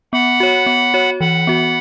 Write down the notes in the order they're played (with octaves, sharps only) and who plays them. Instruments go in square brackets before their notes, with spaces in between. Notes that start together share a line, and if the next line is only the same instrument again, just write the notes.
[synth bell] B3 [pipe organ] F#5 B5
[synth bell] F#4 C#5
B3
F#4 C#5
[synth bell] E3 [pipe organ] F#5 B5
[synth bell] B3 F#4